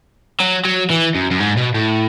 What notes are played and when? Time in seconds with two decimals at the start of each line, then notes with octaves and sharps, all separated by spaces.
0.40 F#3
0.65 F#3
0.90 E3
1.15 F#2
1.31 F#2
1.40 G#2
1.57 B2
1.74 A2